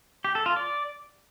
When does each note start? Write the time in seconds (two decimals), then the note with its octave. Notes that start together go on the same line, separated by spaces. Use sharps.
0.24 G4
0.35 A4
0.46 F4
0.57 D5